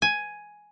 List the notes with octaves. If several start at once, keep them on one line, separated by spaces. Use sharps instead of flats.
G#5